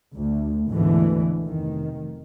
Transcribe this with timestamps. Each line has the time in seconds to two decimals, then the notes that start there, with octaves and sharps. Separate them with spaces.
0.15 D2
0.69 D2 G#2 B2 D3 E3
1.44 F1 D#3